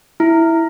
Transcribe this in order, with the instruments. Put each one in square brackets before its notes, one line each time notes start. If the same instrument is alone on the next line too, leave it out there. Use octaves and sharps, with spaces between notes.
[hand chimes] E4